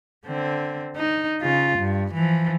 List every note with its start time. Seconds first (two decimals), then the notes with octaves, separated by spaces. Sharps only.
0.26 D3 C4
0.96 D#4
1.42 C#3 F4
1.79 G2
2.14 E3 F3